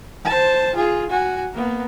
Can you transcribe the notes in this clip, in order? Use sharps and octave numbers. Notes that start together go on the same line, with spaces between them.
C5 A5
F4 G#4
F#4 G#5
A#3 B3